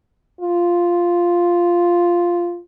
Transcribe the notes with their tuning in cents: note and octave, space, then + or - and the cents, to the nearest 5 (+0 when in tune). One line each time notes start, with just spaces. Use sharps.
F4 -5